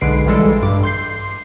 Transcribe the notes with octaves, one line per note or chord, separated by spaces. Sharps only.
B1 D3 G#3 B4 C7 D7
A#1 E3 G3 G#3 A4
G2 D6
C6 G6 C7